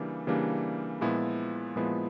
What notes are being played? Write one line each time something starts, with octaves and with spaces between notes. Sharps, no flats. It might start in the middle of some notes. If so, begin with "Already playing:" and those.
Already playing: C#3 E3 G3 A#3 D4
C#3 E3 G3 A#3 D4
A#2 F3 G#3 B3 E4
A#2 F3 G#3 B3 E4